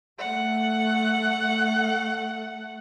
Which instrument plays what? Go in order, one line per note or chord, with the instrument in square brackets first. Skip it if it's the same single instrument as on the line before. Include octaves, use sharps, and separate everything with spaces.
[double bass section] A3 [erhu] F#5